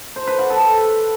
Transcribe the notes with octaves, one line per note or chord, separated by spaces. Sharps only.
C5
B4
F#5
A4